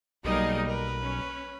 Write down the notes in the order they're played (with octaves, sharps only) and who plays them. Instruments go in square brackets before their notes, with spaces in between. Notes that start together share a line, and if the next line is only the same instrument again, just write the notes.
[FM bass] B1 [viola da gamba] G3 A#3 A#4 [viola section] D#4 G#4 D#5
[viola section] A#4 [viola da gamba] B4
[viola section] C#4